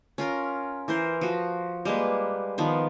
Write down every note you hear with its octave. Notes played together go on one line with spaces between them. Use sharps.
C#4 F4 A#4 A#5
E3 A#4 C5
F3 F#4
G3 G#3 A#3 B4
D#3 F3 B3